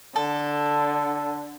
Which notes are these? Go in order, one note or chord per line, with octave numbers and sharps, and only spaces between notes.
D3 A4